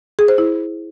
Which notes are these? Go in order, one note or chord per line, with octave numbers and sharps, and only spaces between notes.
G#4
C5
E4